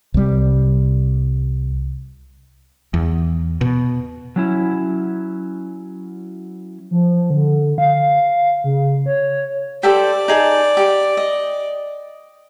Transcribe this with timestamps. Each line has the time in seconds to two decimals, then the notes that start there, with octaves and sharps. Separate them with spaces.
0.14 C2 G3
2.94 E2
3.61 B2
4.36 F#3 C#4 E4
6.91 F3
7.30 D3
7.78 F5
8.64 C#3
9.06 C#5
9.83 G4 A4 C5 D5
10.28 D#4 G#4 A5
10.77 G4
11.17 D#5